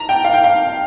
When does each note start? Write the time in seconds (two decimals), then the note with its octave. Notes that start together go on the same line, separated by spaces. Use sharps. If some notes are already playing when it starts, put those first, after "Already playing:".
Already playing: A5 A#5
0.09 G5
0.24 F5
0.34 G5
0.44 F5